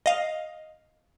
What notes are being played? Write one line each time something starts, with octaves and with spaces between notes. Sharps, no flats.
D#5 F5